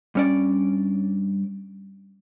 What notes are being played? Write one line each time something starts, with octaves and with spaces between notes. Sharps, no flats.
G2 C#4 D5